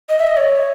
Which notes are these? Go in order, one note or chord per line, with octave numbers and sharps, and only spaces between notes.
D#5
E5
D#5
C#5